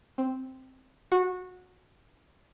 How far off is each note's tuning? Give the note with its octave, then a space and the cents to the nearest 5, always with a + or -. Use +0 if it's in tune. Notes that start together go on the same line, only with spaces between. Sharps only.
C4 +0
F#4 -20